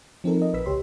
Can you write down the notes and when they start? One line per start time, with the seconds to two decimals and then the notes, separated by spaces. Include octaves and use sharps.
0.24 F3 C4 D#4 A4 A#4
0.37 A#4 D#5
0.53 A#1 B4 E6 B6
0.66 C#2 G4 C#5 C6